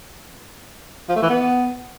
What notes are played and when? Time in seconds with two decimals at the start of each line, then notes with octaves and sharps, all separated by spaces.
1.09 F3
1.16 A3
1.23 E3
1.29 B3